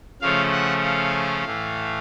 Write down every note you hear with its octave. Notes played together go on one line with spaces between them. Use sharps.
C#3 F3 A3 C#4 F5
F#5
F5
A2 E3 A3